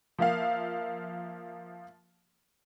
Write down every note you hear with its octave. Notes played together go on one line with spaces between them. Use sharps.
F3 A#3 E5 F5